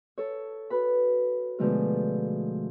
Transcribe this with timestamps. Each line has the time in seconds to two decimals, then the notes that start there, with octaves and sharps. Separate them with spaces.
0.18 A4 C#5
0.70 F#4 B4 B5
1.59 B2 D3 F3 G#3 A3 F4